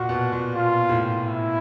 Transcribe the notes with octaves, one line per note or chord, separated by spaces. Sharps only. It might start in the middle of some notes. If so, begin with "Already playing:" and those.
Already playing: A#2 F#4
B2
A#2
B2 F4
A2
E4